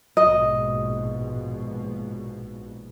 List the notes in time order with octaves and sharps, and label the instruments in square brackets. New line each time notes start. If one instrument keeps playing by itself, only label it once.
[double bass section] A#1 G#2 B2 [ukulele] D#5